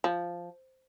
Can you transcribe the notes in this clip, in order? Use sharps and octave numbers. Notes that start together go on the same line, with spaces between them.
F3